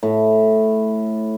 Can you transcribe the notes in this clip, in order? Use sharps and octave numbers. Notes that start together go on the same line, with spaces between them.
A2